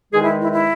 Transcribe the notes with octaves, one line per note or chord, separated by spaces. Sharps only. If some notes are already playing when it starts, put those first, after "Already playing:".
E2 D#3 G#3 D#4 G#4
E4
E4
E4